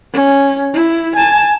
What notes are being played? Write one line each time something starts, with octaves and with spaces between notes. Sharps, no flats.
C#4
E4
G#5 A5